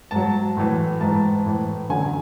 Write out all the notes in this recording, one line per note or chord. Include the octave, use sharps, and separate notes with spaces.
G#2 F#3 A5
A2 E3
G#2 E3 A5
A2 E3
F#2 D3 F#3 G#5